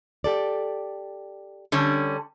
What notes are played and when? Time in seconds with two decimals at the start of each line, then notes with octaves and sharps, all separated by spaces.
0.24 G4 A4 D5
1.72 D3 G3 C#4